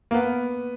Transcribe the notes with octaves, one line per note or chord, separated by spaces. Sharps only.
A#3
B3